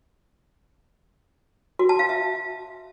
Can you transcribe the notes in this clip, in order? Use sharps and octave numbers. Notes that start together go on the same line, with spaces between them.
F#4
A5
F5
E5